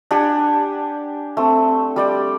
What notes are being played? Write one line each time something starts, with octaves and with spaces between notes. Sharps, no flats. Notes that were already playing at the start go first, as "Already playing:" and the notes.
D4 G4 F#5 G#5
A3 C4
G3 D5 G5